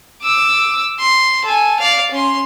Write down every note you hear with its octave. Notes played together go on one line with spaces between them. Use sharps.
D6 E6
C6
A4 G#5
D5 F5
C#4 C6